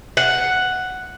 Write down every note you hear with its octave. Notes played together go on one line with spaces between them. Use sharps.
F#5